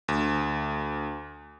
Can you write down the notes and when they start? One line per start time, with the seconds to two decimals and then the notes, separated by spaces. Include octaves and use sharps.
0.08 D2